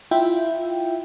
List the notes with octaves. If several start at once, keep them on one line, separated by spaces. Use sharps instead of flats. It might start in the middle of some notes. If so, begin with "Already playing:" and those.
E4 F4 E5 G5